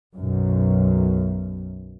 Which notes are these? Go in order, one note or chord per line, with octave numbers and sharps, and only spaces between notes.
B1 F#2